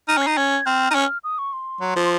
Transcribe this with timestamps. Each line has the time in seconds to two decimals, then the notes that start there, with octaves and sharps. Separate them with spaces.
0.08 D#4 F6
0.17 C#4 C7
0.27 D#4
0.37 C#4 G#6
0.66 C4 F6
0.91 D#4
0.95 C#4
1.24 D#6
1.38 C#6
1.53 C6
1.81 F#3
1.96 F3